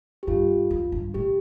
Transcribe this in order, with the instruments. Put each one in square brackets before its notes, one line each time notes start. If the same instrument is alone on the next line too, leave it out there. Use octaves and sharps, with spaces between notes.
[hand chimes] G4
[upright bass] G2 [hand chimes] F4
[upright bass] F2
G2
[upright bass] A2 [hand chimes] G4